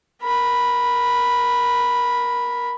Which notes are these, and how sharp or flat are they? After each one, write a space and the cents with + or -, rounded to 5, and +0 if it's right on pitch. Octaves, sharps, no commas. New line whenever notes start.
A#4 +15 B5 +0